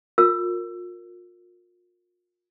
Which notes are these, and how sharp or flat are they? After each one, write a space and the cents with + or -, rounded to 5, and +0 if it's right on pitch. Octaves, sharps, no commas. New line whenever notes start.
F4 +35 A#4 -10 E6 +20